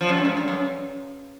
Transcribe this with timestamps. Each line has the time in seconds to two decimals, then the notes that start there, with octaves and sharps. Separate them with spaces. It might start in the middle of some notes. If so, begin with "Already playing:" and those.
0.01 F3
0.09 F#2
0.17 G2
0.25 G#2
0.37 G2
0.48 F#2